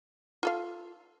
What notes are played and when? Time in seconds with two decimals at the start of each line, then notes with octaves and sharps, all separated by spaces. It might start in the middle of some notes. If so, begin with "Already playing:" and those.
0.43 F4 A4 F5